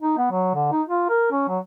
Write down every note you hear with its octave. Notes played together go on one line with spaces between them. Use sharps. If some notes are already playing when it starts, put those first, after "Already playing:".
D#4
B3
F#3
D3
D#4
F4
A#4
C#4
F#3